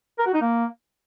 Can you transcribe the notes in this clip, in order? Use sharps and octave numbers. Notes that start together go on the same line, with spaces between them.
A#4
F#4
D#4
A#3